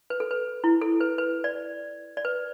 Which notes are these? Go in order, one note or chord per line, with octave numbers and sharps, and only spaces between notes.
B4
A4
B4
E4
A4
B4
B4
D5
D5
B4